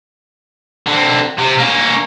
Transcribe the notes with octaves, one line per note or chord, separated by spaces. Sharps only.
D3 C4
C3
A#3 C#4